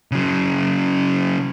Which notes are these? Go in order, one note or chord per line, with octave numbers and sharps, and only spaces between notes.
C#3 F#3